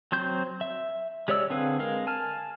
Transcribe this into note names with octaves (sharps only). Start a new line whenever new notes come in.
F#3 C4 C5 G6
E5
G#3 G4 C#5 D5 E6
D3 C4 G#4 B4 F5
G#3 A#4 F5
G#5 A5 F6